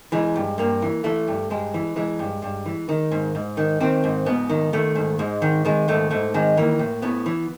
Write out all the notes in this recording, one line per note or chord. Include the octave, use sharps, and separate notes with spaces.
E3 G#3
G2
G2 A#3
E3
E3 A3
G2
G2 G#3
E3
E3 G#3
G2
G2
E3
D#3
G#2
G#2
D#3
D#3 C4
G#2
G#2 B3
D#3
D#3 A3
G#2
G#2 G#3
D#3
D#3 G#3
G#2 A3
G#2 A3
D#3 G#3
E3 A#3
A2
A2 B3
E3